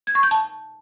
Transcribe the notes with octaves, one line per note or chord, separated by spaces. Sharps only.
G#6
C#6
G6
A5